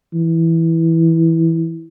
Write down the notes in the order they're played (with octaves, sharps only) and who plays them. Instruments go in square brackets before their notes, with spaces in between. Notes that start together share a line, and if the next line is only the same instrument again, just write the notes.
[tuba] E3